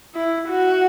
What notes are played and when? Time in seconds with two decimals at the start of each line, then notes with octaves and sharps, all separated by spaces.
0.15 E4
0.49 F#4